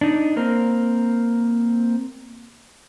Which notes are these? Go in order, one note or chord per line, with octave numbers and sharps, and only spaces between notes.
D4 D#4
A#3 C4 A#4